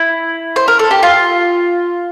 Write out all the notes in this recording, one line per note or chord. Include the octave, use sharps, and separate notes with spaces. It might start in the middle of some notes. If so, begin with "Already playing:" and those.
Already playing: E4
C5
A#4
A4
G4
F4